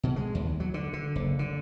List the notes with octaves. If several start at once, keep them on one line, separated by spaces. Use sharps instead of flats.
B2
G#3
D#2
F#3
D3
D3
F#1
D3